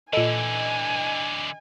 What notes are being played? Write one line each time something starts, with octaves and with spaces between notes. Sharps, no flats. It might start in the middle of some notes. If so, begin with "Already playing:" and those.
A#2 D3 E3 A4 D#5 G#5